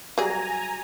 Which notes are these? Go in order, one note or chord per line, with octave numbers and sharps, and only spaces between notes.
F#3 G3 G#4 G#5 A#5